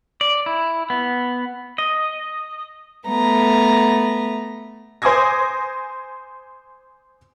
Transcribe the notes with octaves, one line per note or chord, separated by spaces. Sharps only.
D5
E4
B3
D#5
A3 B3 A#5
C5 G#5 D6 D#6 G#6 A#6